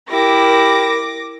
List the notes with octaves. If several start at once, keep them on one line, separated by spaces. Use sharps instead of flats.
E4 G4 A#4 D6 A#6